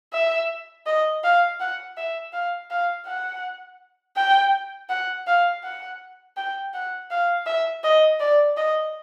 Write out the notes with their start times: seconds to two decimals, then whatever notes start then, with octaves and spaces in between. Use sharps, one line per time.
0.13 E5
0.86 D#5
1.24 F5
1.60 F#5
1.97 E5
2.33 F5
2.71 F5
3.06 F#5
4.17 G5
4.90 F#5
5.27 F5
5.64 F#5
6.37 G5
6.74 F#5
7.11 F5
7.47 E5
7.84 D#5
8.20 D5
8.57 D#5